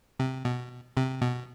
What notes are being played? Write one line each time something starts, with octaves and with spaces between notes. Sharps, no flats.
C3
B2
C3
B2